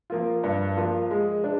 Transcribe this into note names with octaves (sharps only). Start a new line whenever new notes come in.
F3 A#3 F4
G2
F3 A#3 F4
G#3
D4